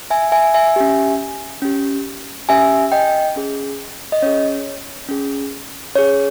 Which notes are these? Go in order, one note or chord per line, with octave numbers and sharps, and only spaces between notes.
E5 G#5
E5 G#5
E5 G#5
C#4 G4
C#4 G4
C#4 G4 E5 G#5
D#5 G5
C#4 G#4
D#5
C#4 G#4 C#5
C#4 G#4
C#4 G#4 C#5